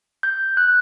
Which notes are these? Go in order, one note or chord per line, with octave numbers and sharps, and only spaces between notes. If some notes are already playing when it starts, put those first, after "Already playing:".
G6
F#6